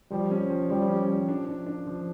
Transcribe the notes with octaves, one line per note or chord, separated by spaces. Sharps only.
F3 G3
C#4
F3
F3 G3
C#4
F3
D4
D4
D4
F3